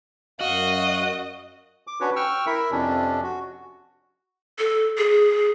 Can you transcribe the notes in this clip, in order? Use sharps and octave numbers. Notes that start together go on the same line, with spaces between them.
F#2 F#4 D#5 F5
D6
C#4 D4 F#4 B4 C#5
G5 C#6 E6 F6
E4 A#4 E5 B5
F2 C3 C#4 D4
F#4
A4
G#4